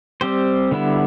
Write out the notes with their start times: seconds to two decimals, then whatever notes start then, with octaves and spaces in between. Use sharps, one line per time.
0.21 G3 C4 G4 C5
0.71 D3 G3 B3 E4